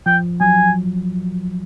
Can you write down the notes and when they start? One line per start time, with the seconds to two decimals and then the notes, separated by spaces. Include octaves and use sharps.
0.06 F3 G5
0.41 F#3 G#5